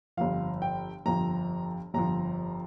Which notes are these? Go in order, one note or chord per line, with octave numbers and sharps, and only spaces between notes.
G1 F2 F3 F5
G5
G1 F2 F3 A#5
G1 F2 F3 A#5